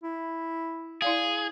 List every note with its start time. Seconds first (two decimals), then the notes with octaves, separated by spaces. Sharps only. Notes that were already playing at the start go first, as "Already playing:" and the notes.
0.03 E4
1.02 E4 G#4 D5 F5